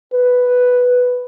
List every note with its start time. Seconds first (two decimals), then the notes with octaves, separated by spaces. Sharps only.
0.13 B4